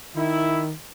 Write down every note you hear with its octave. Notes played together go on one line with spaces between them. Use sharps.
D#3 E4